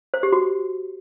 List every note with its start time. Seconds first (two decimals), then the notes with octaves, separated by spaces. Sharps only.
0.14 C5
0.23 G4
0.32 F#4